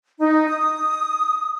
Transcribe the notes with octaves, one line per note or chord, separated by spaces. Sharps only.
D#4
D#6